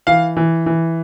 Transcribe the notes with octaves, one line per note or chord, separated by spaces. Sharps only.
E3 F5
E3
E3